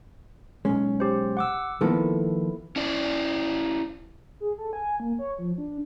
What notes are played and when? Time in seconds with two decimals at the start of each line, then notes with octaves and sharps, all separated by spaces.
0.65 B1 G#3 C#4
1.00 G4 C5
1.37 F#5 D6 E6
1.81 D#3 F3 A#3 B3 E4 A4
2.76 C#4 E4 D5
4.40 G#4
4.58 A4
4.73 G#5
5.00 A#3
5.19 C#5
5.38 F3
5.58 D4